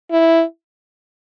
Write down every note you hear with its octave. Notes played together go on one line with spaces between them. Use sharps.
E4